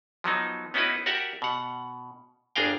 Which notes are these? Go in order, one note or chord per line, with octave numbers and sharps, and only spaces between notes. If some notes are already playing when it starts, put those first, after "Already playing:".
F3 F#3 B3 D#4
B3 C#4 D#4 E4 F#4 B4
F#4 G4 A#4 D5 E5 F#5
B2 F#5
G1 D4 G#4 A#4 F5 G5